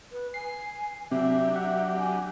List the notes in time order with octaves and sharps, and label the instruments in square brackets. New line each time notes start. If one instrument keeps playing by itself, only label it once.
[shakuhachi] B4
[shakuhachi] G#5 [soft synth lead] C7
[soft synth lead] C3 [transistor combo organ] F#3 D4 G4 [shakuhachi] E5
[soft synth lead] F#5
[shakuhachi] G#5